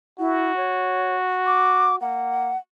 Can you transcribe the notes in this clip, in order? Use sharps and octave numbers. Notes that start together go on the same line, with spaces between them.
E4 F#4
C#5
D6
A#3 F#5